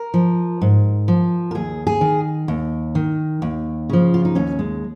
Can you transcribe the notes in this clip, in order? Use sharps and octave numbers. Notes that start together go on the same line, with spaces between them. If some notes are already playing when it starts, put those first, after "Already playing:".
Already playing: A#4
F3
G#2
F3
A#4
D#2 G#4
G#4
D#3
D#2
D#3
D#2
C#3 F3
F4
D#4
D#2 C#4
G#3